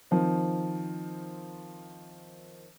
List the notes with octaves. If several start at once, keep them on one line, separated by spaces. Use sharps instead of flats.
D#3 F3 C4